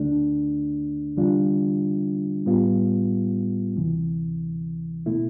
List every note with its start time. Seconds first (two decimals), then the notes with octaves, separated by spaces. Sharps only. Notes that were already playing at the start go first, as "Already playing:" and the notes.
Already playing: D2 D3 A3 D4
1.16 E2 D3 G3 D4 F4
2.46 A2 G3 B3 F4
3.76 D2 C3 E3
5.06 B2 A3 E4